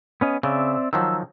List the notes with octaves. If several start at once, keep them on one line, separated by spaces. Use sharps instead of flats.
B3 C#4 D#5
C#3 C4 D5 E5
D#3 F3 F#3 E6